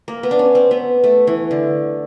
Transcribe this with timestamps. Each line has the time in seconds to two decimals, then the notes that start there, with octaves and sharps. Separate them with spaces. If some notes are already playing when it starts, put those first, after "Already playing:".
0.08 A#3
0.23 B3
0.31 D4
0.39 C#4
0.55 C4
0.71 B3
1.04 A3
1.27 E3
1.51 D3